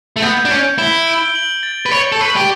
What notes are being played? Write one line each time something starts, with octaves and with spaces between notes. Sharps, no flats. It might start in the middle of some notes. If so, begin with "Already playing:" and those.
A3
B3 G6
D4
C#4 G6
E4 G7
D7
F#7
A6
B4
C#5 F#7
A4
B4 C#6
G4